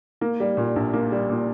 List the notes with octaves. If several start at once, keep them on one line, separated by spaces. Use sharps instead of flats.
A#3
G3
A#2
A#1
A#3
G3
A#2